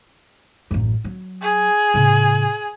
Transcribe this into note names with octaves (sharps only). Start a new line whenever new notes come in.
A1 F#2
F#3
G#4
A2 C#3